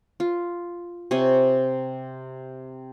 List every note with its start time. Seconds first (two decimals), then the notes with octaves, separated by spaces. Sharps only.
0.20 F4
1.11 C3 C#5 G#5